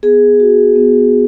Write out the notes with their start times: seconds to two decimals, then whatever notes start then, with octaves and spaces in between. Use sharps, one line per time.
0.03 B3 G#4
0.40 F#4
0.76 B3